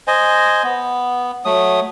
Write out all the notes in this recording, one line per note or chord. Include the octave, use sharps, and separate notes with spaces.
C5 D#5 G#5
B3
F#3 A3 D#6